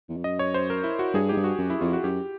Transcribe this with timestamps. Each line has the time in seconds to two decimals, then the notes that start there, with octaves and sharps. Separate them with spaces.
0.09 E2
0.17 F2
0.24 F#2 D#5
0.39 C#5
0.54 C5
0.70 A#4
0.84 E4
0.99 F#4
1.14 G2 G#4
1.29 G#2 G4
1.37 G2
1.44 F#4
1.58 F#2
1.70 E4
1.81 F2 F4
1.93 F#4
2.04 F#2 G4